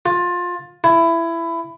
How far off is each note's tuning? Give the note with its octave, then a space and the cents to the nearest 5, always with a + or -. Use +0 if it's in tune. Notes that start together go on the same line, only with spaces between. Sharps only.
F4 +20
E4 +15